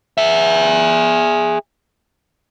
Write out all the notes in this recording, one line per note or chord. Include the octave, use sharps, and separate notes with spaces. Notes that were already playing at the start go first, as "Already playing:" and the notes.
G#4 E5